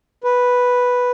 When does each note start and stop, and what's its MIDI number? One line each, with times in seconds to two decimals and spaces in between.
0.24 1.12 71